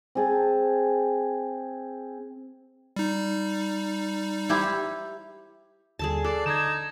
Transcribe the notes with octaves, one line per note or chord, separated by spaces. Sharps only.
C4 G#4 A5
G3 D#4
E4 G4 C5
D#2 D3 G3 G#4 A4 A5
A4 D5 F#6 G#6 C7
D3 D#4 G#6 E7